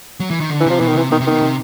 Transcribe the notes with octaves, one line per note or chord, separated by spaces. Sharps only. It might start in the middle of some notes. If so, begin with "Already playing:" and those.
F#3
E3
D#3
D3
E3
C3 F3
B2 E3
D#3
C3 E3
B2 D#3
C3
B2 D#3
C3